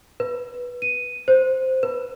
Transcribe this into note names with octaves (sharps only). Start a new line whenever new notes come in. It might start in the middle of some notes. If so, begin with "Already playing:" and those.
B4
D#7
C5
B4